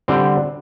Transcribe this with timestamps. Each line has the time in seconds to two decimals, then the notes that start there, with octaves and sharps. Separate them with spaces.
0.08 D3 G3 C4 G5